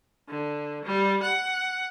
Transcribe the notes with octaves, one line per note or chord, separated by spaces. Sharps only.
D3
G3
F#5